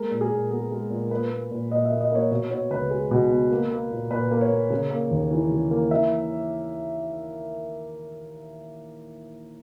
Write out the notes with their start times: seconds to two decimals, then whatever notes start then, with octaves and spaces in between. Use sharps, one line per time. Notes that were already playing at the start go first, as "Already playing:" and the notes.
Already playing: G#3 A#3 A#4
0.11 A#2
0.21 G#4
0.32 A#2
0.50 B3 G#4
0.71 G#3
0.90 A#2
1.11 A#3 B4
1.30 A#3
1.51 A#2
1.71 A#2 D#5
1.85 E5
1.91 A#3
2.01 D#5
2.11 A#3 C#5
2.31 B2 C#5
2.50 B3 C#5
2.71 C#2 B4
2.91 G#3
3.11 B2
3.30 B3
3.51 A#3
3.71 A#3
3.91 A#2
4.11 A#2 B4
4.31 A#3
4.41 C#5
4.51 A#3
4.70 C#3
4.90 A#3
5.11 D#2
5.31 E3
5.51 C#3
5.71 A#3
5.91 E3 E5